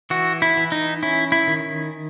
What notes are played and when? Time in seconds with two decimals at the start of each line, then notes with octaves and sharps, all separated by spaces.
0.10 E3 F#4
0.42 E4
0.57 E3
0.72 D#4
1.03 C#4 E4
1.32 E4
1.47 D#3